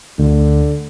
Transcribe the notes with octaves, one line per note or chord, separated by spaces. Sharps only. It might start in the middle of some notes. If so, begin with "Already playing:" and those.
D2 D3